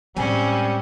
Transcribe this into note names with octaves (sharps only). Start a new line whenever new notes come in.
A2 G3 G#3 C4 C#4 G#5